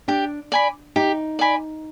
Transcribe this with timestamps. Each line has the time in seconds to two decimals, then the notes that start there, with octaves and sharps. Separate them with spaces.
0.08 D4 G4
0.52 D5 G#5 B5
0.96 D#4 G4
1.39 D5 G#5 B5